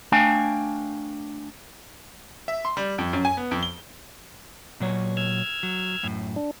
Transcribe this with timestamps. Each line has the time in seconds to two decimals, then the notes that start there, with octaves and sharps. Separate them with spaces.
0.12 A3 D4 F5 G5 G#5
2.48 E5
2.65 C6
2.77 G3
2.98 F2
3.13 F#2
3.25 G#5
3.37 B3
3.51 F2
3.63 G7
4.80 A#2 F#3 C#5
5.17 E6 F6 G#6
5.63 F#3
6.03 F#2 A2
6.36 D4